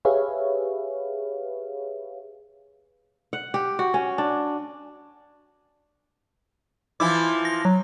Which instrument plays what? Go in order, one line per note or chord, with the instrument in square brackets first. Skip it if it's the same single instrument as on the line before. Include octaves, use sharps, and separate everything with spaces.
[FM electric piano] G4 G#4 B4 C#5 E5 F5
[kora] F#5
G4
F#4
C#4
D4
[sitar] E3 F3 E4 [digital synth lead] D6
[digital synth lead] A#6
F#3